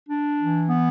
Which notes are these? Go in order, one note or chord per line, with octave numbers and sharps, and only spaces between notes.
D4
E3
B3